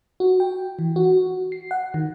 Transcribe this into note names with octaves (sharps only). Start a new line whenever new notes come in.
F#4
G5
E3
F#4
C7
F#5
D#3